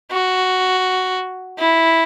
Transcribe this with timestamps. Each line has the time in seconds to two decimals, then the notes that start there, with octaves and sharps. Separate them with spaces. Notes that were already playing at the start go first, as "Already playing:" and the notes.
0.12 F#4
1.59 E4